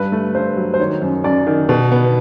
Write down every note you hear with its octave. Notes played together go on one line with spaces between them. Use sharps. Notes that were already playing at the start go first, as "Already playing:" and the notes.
Already playing: G2 B4
A3
G2 C5
F#3
C5
D#3 C#5
F#2
F#2 D5
D#3
B2
B3